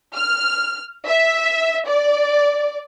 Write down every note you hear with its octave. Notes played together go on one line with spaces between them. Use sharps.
F6
E5
D5